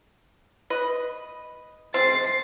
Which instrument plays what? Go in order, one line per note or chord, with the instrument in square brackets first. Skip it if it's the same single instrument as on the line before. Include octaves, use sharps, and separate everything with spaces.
[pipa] B4 D#5
[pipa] G#3 C4 [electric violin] A6 C7